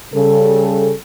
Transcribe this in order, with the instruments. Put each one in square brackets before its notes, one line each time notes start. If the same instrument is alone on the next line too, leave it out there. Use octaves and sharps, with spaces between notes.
[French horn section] C#3 G3 A4